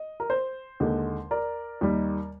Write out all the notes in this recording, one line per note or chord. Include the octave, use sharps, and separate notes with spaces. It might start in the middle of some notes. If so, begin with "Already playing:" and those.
Already playing: D#5
A#4
C5
D#2 D3 G#3
A#4 D5
D#2 D#3 G3